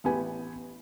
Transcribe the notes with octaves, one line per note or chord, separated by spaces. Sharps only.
A1 B3 G4 G#5